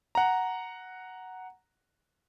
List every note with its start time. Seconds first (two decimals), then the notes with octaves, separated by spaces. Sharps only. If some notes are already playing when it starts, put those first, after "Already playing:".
0.15 F#5 A#5